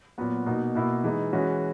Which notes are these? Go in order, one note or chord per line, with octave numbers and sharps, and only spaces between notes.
A#2 F#3 B3 F#4
B2 A#3 D#4
B2 A#3 E4
E3 G#3 D#4
E3 G#3 C#4 F#4